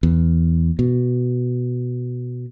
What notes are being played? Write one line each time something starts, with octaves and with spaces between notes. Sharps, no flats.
E2
B2